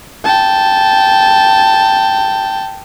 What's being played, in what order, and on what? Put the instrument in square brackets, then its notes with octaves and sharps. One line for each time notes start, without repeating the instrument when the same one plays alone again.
[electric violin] G5 A5